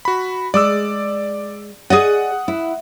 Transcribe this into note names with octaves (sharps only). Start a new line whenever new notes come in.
F#4 B5
G#3 D5 D6 E6
G#4 D5 D#5 F#5 D#6
E4